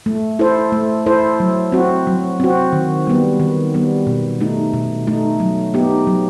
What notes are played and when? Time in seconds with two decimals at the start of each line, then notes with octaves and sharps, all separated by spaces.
0.06 A3
0.39 E4 A4 C5
0.72 A3
1.06 E4 A4 C5
1.40 F#3
1.72 C4 F#4
2.07 F#3
2.40 C4 F#4
2.73 D#3
3.07 G3 B3
3.40 D#3
3.74 G3 B3
4.07 B2
4.41 A3 D#4
4.74 B2
5.07 A3 D#4
5.40 F#3
5.74 B3 D#4 G4
6.07 F#3